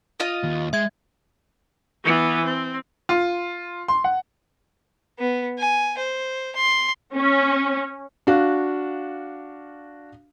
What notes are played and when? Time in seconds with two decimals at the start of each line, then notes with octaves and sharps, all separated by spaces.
0.20 F4 D#5
0.43 D#2
0.73 G#3 E5 G#6
2.04 E3 B3
2.45 C4
3.09 F4
3.88 C6
4.04 F#5
5.19 B3
5.59 G#5
5.98 C5
6.56 C6
7.15 C#4
8.27 D4 F#4 F5